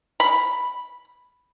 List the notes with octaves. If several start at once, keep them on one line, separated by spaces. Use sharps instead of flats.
B5